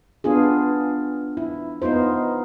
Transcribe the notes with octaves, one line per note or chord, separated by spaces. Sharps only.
B3 D4 F4 G#4
E4
B3 D#4 F4 C5